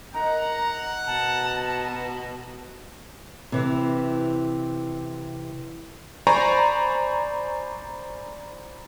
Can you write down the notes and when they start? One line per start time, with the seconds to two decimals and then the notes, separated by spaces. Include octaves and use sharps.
0.14 D#4 A#4 F#5 A#5
1.07 B2 A5
3.52 C3 E3
6.27 C5 D5 G#5 A#5 B5 C#6